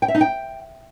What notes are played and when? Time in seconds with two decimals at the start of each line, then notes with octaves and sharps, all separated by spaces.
0.02 G5
0.08 E5
0.15 D#4
0.21 G5